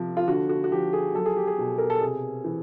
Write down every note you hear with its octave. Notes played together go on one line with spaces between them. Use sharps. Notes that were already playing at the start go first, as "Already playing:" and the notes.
Already playing: C3 F3
F4
D3 F#4
F#4
F#4
F3 G4
G#4
F#3 A4
G#4
G4
G#4
B2
A#4
A4
C3 G#4
E3